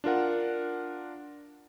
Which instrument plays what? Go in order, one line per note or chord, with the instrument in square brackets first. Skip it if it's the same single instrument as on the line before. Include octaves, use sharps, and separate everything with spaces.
[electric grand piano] D4 F4 A#4 F#5